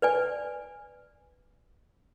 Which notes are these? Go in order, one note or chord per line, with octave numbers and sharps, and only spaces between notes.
B4 D5 G#5